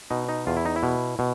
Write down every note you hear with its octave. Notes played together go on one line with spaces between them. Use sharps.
B2 D#4
D#4
E2 F4
E4
D#4
E4
B2
B2